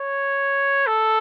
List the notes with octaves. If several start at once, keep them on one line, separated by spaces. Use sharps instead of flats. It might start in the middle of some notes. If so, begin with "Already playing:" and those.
Already playing: C#5
A4